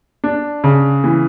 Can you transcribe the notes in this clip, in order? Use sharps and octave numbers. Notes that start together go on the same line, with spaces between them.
D4
C#3
E3